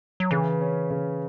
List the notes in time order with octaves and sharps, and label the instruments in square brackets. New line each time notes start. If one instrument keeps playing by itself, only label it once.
[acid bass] F#3
[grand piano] C#3 [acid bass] E3
[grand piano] C#4
C#3